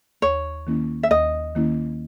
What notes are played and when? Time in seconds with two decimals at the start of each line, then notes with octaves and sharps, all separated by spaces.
0.22 D#2 C#5
0.67 D#3 A#3 C#4 E4
1.03 E5
1.11 D#2 D#5
1.55 D#3 A#3 C#4 E4